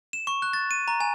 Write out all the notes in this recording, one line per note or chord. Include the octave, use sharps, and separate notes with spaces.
E7
C#6
F#6
A6
D#7
A#5
G#5